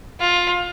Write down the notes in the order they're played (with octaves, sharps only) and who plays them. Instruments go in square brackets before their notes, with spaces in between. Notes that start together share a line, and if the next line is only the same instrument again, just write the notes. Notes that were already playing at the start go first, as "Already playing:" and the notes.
[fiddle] F4